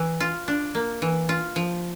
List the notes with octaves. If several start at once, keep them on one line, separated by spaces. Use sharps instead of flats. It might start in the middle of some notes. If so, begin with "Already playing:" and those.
Already playing: E3
F4
D4
A#3
E3
F4
F3